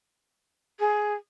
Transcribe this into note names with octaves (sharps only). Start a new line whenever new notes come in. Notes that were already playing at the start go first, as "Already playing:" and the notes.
G#4